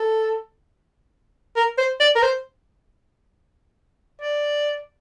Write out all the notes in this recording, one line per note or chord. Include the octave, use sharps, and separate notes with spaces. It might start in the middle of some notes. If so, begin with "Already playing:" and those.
Already playing: A4
A#4
C5
D5
A#4
C5
D5